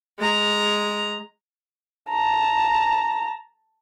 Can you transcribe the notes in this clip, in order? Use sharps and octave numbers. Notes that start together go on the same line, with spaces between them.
G#3 A#5
A5 A#5